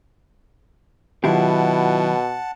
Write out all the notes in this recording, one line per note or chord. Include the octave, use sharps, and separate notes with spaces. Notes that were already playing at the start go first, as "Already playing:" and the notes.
B2 D#3 F#3 E4 F4 G4 F#5 A5